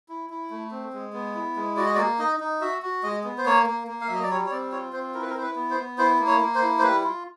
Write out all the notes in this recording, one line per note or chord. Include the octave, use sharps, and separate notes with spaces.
E4
E4
A3
C4
G#3
B3
E4
G#3
F#4 D5
D#5
A#3 D5
D#4 D#5
D#4
F#4 E5
F#4
G#3 D#5
B3
C5
A#3 C#5
A#3
A#3
F5
F#3 E5
D#5
D5
G3 C#5
C#5
C4 D5
F4 C#5
C4 C5
E4 A#4
B4
A#4
E4 C5
B4
B3
C5
B3
E4 C5
A#3
C#5
A#3
C5
E4
C5
G3 B4
F4